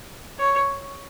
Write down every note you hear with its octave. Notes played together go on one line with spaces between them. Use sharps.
C#5